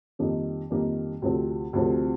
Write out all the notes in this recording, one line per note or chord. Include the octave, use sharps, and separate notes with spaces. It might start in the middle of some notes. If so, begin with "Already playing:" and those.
F2 D#3 G3 A#3
F2 D#3 G3 A#3
D2 C3 F3 C4
D2 C3 F3 C4